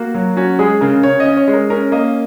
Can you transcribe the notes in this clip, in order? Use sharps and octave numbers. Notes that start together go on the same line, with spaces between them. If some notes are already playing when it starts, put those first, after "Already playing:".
Already playing: A#3 F#4
F#3
C#4 F#4
G#3 G#4
C#3 A#4
C#3 C#5
D#5
C#4
C#5
G#3
A#4
C#4 A#4
A#3 D#5